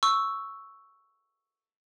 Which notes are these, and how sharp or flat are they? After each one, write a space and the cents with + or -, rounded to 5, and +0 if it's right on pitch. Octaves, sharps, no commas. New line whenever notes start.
C#6 +0 E6 +0